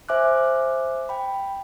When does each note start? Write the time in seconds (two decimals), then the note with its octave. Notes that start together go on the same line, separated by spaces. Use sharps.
0.09 C5 E5 G#5 D6 F6 F#6
1.09 G5 B5